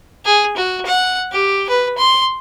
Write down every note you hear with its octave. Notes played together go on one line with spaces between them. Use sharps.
G#4
F#4
F#5
G4
B4
C6